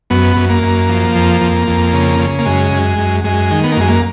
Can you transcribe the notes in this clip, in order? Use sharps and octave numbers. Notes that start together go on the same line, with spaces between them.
F#2 B3
F#2
A#3
F#2
F3
F2
F2
F2
C#3
C#3
A#3
F#2 G#3
F#2
F#2
F#2 G#3
D#3
B3
A#3
F#2 G#3
A#3